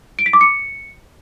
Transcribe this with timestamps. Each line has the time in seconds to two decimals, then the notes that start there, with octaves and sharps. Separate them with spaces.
0.19 D7
0.26 B6
0.33 D6
0.41 C#7